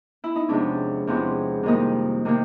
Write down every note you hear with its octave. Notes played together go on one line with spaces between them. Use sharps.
E4
D#4
E2 C3 F3 G#3 C#4 D4
E2 C3 F3 G#3 C#4
F2 C3 D#3 G3 A#3 D#4
C3 D#3 G3 A#3